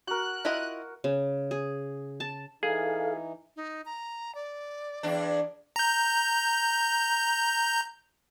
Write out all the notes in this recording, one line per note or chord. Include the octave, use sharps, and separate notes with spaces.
F#4 A#4 F#6
E4 F4 D#5
C#3
G#4
A5
E3 D#4 G#4 A4 F5
D#4
A#5
D5
E2 D4
A#5 G6